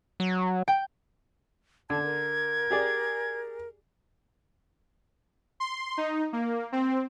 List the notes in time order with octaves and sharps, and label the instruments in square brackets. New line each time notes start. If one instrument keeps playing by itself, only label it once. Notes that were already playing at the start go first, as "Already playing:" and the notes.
[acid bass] F#3
[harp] G5
[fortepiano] D3 [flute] A5 [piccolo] G#6
[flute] A#4
[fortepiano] G4 G#4 D5
[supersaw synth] C6
D#4
A#3
C4